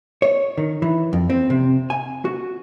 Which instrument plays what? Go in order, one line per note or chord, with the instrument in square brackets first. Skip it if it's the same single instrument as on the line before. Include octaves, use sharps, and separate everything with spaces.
[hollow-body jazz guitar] C#5
D#3
E3
F2
C4
C3
G#5
F#4